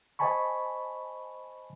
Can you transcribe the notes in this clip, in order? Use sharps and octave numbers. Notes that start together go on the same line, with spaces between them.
C5 D#5 G#5 A5 B5 C#6